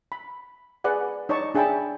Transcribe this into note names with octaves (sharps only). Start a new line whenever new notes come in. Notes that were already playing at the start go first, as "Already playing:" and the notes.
B5
G#4 B4 D5 F#5
D#4 C#5 D5 A5 C#6
D4 G#4 E5 G5 A5 B5